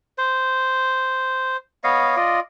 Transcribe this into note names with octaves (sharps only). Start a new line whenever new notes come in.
C5
B3 C#5 D#5 F5
F4 D5 D#5